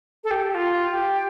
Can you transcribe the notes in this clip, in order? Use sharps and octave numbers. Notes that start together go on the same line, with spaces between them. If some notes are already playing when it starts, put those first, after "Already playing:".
A4
G4
F4
G4